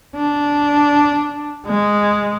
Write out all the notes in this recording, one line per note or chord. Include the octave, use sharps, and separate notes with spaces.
D4
G#3